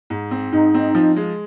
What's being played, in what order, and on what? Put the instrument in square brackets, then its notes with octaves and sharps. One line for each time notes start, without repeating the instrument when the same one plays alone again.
[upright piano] G#2
C4
[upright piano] G#2 [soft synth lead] D#4
[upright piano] C4
F3
G#3